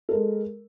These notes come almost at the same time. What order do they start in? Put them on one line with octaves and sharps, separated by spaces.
A4 A#4 G#3